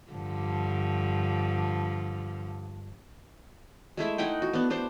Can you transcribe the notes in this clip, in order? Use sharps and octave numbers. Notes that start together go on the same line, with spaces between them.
G2 D3 F3
G#3 A3 E4 E5
D#4 E4 F#5 G5
F#4
B3 D4
B3 D4 C5